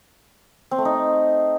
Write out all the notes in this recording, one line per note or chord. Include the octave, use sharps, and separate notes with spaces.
C4
A3
D#4